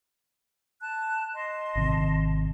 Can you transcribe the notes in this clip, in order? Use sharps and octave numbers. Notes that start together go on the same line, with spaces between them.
A5 F#6
D#5 A5 C6
G#1 C3 D#3